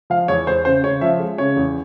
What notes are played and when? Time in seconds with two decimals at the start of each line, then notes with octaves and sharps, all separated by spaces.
0.10 F3 F5
0.28 E2 C#5
0.47 E2 C5
0.65 C#3 C5
0.83 C#3 C#5
1.01 F3 E5
1.20 G#3
1.38 C#3 C#5
1.57 E2